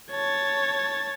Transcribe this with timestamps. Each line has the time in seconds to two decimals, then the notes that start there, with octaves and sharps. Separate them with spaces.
0.11 C#5 A5